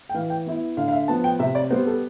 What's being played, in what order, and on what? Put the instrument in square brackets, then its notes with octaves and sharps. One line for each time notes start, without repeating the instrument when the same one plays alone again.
[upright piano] G5
E3 F5
G5
B3 E4
D3 F5
F5
E5
F3 B3 A5
G5
C3 E5
D5
G3 B3 C5
A4